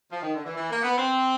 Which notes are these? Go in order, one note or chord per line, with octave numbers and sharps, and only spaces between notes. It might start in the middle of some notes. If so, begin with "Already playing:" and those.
F3
D#3
D3
E3
E3
A#3
B3
C4